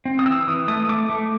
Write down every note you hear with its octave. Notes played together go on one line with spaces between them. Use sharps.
C4
D#6
E3 E6
E3 D#6
A3 D#6
A3 D6
A3